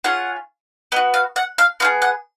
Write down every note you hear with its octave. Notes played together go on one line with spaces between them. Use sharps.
C#4 F4 G#4 F#5
B3 F#4 D#5
F5
F#5
F5
B3 F4 G#4 F5
F#5